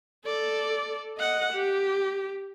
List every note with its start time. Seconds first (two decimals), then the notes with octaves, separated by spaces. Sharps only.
0.25 A4 D5
1.18 D#5 F#5
1.54 G4